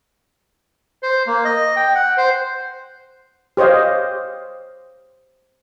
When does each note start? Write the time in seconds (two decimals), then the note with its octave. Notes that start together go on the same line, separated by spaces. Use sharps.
1.03 C5
1.27 A#3
1.45 D#5
1.76 G5
1.95 F#5
2.17 C5
3.57 G4 C5 C#5 D#5 F5